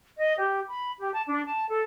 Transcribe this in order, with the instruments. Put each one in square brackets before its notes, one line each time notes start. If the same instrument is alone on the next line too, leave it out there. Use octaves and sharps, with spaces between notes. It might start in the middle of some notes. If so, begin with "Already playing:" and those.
[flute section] D#5
G4
B5
G4
A5
D4
A5
A4